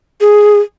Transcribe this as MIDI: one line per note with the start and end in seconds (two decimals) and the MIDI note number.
0.21 0.59 68